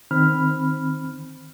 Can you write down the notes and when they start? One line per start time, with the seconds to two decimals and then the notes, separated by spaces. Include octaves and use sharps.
0.11 D#3 C4 B5 F6